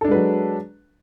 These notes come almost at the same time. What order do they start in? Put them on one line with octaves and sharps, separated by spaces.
A4 D4 G#3 B4 F#3